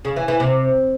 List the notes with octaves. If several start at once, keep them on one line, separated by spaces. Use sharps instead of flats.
C#3
E3
E3
C3